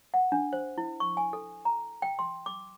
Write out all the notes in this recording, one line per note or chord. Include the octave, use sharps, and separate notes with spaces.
F#5
D4
C5
E4
C#6
G#5
A4
A#5
G5
C6
D6